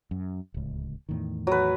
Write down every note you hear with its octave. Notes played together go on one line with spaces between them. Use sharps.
F#2
D1 C#2
E2 A2 D#3
F#3 B4